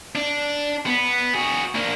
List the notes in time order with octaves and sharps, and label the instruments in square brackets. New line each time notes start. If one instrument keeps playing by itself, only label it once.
[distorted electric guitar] D4
B3
F#4 G#4
A#3 D4